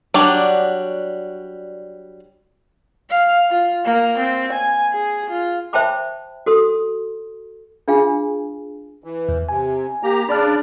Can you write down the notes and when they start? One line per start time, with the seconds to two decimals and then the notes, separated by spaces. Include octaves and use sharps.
0.14 F#3 G3 D4
3.10 F5
3.50 F4
3.85 A#3
4.18 C4
4.52 G#5
4.92 G#4
5.30 F4
5.73 C5 E5 G5 A5 B5 D6
6.46 F#4 A4 C6 D#6
7.88 D4 F4 G#4 F5 G5 G#5
9.04 E3
9.29 E2
9.49 C3 G#5
10.03 A#3 G4 A#5
10.29 C#3 D4 D5 B5 F6